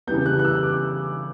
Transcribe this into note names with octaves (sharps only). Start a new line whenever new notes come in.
C#3 E3 G3 B3 G6
F#6
F#6
E6
D6